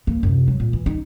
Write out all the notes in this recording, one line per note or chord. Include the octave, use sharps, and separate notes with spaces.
E3 A#3
F#2 C3
F#3
A#2
E3
D#4